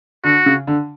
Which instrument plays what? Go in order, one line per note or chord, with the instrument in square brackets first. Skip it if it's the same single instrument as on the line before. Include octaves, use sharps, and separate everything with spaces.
[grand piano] D3 [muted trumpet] F#4
[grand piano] C#3
D3